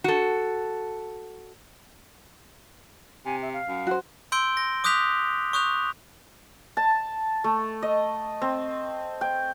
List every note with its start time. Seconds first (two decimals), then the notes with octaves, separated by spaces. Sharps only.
0.04 F#4 A4
3.25 C3 G#5
3.42 E5
3.54 F5
3.67 F#2
3.87 F#4 C5
4.32 C6 E6 G6 D7 G7
4.57 A#6
4.84 D6 D#6 F#6 G6 B6 F7
5.53 C#6 D#6 F#6 G6 F7
6.77 A5
7.44 A3
7.83 D#5
8.42 C4
9.21 G5